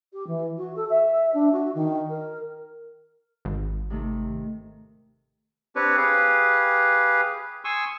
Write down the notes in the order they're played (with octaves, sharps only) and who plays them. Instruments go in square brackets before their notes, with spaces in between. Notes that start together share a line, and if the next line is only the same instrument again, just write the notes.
[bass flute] G4
E3
F#4
A4
E5
D4
F#4
D#3
A#4
[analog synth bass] G#1
[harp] C3 D#3 A3
[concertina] C4 D4 G4 B4 C#5
G4 G#4 B4 F5
G#5 C6 C#6 D#6 E6